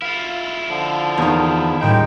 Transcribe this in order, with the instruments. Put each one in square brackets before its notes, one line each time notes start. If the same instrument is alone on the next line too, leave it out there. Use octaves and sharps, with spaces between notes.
[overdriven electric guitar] E4 F4 [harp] F5
[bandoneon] D3 F3
[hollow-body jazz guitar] E2 D#3 [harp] F5 D#6 G6
[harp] D#1 A2 D7 [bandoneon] G#3 D#4 G5